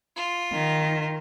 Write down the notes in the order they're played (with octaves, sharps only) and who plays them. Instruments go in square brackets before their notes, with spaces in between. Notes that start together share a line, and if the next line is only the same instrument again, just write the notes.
[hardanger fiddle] F4
[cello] D#3